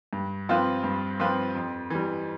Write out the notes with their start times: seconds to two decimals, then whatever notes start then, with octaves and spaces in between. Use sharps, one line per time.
0.13 G2
0.49 F3 C4 F4 B4
0.84 G2
1.19 F3 C4 F4 B4
1.55 F2
1.90 E3 G3